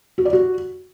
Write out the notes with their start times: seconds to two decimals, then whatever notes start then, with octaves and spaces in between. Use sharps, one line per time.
0.18 F#4
0.25 D5
0.33 F#4